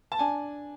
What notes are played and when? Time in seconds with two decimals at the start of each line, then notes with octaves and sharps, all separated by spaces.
0.12 A5
0.19 D4 G#5